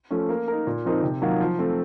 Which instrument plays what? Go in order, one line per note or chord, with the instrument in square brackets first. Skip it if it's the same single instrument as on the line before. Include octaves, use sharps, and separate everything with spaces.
[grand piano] F3 A3 C#4
A#3
D#4 A#4
A#2
F3 C4 D#4 A#4
C3
D#3 F#3 A#3 F4
F3
A3 C4